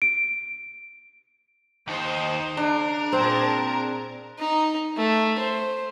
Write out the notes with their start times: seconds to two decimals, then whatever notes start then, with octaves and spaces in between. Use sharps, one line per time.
0.02 D7
1.88 D#2 D#4 C5
2.57 C#3 D4 A#4
3.12 A#2 C4 G#4 A5
4.39 D#4
4.97 A3
5.39 C5